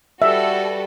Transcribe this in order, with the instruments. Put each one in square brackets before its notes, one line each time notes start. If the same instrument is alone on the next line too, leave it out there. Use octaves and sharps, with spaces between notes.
[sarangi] G3 [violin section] F#4 A4 B4 [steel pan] E5